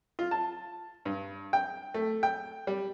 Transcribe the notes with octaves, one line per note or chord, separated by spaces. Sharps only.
F4
A5
G2
G5
A3
G5
G3